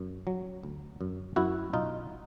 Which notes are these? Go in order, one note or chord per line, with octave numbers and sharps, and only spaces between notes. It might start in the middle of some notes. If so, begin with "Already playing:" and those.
Already playing: F#2
F#3
D2
F#2
F#2 E4 F#4
B1 D#4 F4